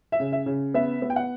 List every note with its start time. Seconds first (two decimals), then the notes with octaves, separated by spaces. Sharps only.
0.12 E5
0.20 C#3
0.32 E5
0.46 C#3
0.74 B3 E5
1.02 B3
1.10 G5
1.16 F#5